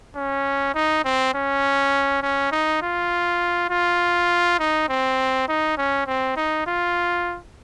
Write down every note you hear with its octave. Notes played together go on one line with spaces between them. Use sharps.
C#4
D#4
C4
C#4
C#4
D#4
F4
F4
D#4
C4
D#4
C#4
C4
D#4
F4